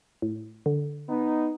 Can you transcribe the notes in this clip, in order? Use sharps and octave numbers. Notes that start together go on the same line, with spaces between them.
A2
D3
B3 D#4